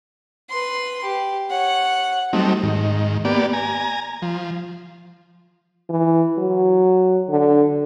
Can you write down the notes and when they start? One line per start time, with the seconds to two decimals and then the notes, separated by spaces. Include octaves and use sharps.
0.49 B4 C6
1.04 G4
1.50 C#5 F#5
2.33 F#3 G3 A3 C4 D#4
2.63 G#2 D#3
3.25 A#3 B3 G4 D5
3.53 G#5 A#5
4.22 F3
5.90 E3
6.38 F#3
7.29 D3